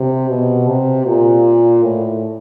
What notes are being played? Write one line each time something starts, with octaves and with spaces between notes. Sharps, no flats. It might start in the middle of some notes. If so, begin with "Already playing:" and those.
Already playing: C3
B2
C3
A#2
A2